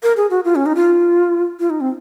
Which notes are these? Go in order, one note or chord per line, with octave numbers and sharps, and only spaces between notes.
A#4
G#4
F#4
F4
C#4
D#4
F4
F4
D#4
C4